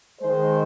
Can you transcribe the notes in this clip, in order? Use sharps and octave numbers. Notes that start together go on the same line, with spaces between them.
D#3 G#3 C5